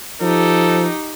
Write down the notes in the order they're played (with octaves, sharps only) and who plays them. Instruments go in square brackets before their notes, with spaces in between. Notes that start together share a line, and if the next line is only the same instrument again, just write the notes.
[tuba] F3 [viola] D#4 G4 [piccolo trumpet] A4